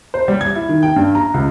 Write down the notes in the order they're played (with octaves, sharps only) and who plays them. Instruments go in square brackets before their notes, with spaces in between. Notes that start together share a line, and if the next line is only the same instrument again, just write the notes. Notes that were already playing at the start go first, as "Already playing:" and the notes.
[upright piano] C5
G3
G#6
E4
D#3
G5
G2
A#5
C#2